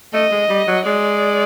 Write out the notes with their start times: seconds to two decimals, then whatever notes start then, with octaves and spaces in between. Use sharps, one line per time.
0.13 A3 D#5
0.31 G#3
0.49 G3
0.68 F#3
0.85 G#3 D5